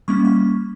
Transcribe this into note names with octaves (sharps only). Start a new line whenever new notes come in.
G3 A#3 C#4 C#6
C#6